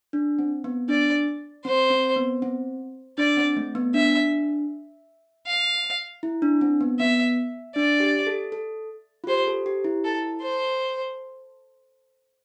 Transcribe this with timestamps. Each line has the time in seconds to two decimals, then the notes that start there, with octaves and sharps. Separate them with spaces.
0.13 D4
0.39 C4
0.64 B3
0.89 D4 D5
1.65 C4 C5
1.90 C4
2.16 B3
2.42 C4
3.18 D4 D5
3.37 C4
3.57 A3
3.75 B3
3.94 D4 E5
5.47 F5
6.23 E4
6.42 D4
6.61 C4
6.81 B3
6.99 B3 E5
7.75 D4 D5
8.00 G4
8.27 A4
8.52 A4
9.24 F4
9.27 G4 C5
9.47 A4
9.66 G4
9.84 E4
10.04 A4
10.42 C5